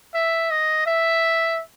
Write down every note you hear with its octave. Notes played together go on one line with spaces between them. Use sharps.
E5
D#5
E5